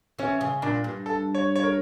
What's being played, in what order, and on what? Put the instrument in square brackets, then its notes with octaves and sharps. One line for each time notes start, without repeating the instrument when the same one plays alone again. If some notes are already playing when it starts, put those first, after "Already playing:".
[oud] E3 [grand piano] C#4
[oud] C#3
[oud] A#2 [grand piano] D4
[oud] G2
[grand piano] A4
C#5
C#5
A#4